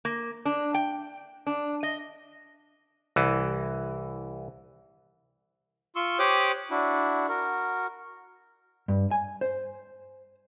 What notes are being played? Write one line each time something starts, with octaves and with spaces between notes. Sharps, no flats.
A#3
D4
G5
D4
D#5
C2 E3
F4 C6 C#6 E6
G4 C5 C#5 D6 D#6 F#6
D4 E4 F#4
F#4 A#4
G2
G#5
C5